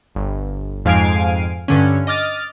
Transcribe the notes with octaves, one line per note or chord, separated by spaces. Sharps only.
G1
F2 G#2 F5 G#5 C7 D7
G2 D3 C#4
D#5 D6 F6 A6